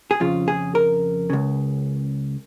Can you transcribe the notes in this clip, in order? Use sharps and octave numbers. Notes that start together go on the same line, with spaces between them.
G#4
F2 C#3 F4
G#4
A#4
C#2 C#3